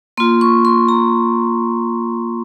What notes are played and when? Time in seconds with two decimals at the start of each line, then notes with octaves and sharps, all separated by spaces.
0.17 A#3 F4 C6
0.41 C#6
0.65 C6
0.88 A#5